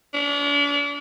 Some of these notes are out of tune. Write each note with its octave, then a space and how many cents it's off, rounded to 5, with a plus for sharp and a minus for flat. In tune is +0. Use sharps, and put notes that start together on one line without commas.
D4 -40